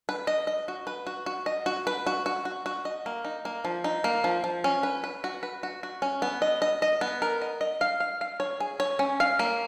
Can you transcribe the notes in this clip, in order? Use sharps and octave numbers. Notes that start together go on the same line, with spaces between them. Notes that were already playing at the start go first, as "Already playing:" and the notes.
B4
D#5
D#5
F#4
B4
F#4
F#4
D#5
F#4
B4
F#4
F#4
F#4
F#4
D#5
A#3
D#4
A#3
F3
D#4
A#3
F3
F3
C#4
B4
B4
F#4
B4
F#4
F#4
C#4
B3
D#5
D#5
D#5
B3
A#4
D#5
D#5
F5
F5
F5
C#5
G#4
C#5
C#4
F5
A#3